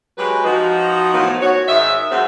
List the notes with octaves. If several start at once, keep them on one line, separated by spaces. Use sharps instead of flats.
F#3 G#3 G4 B4
F3 D#4 F#4
A2 D#3 F3 F#3 B3 D#4
F#4 C#5
G#2 D#3 D#5 E5
G#2 F#3 C4